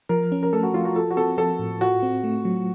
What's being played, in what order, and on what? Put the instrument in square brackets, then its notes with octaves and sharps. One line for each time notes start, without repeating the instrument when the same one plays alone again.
[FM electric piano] F3 [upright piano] A#4
[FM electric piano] C#4
[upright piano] A#4
[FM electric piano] A3 [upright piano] A4
[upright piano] F#4
[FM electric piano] F3 [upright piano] F4
[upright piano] F#4
[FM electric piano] F4 [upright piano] A4
[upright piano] F#4
[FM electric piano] C4 [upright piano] A4
[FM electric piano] F3 [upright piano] A4
[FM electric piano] A2
[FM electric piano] F4 [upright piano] F#4
[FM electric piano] C4
A3
F#3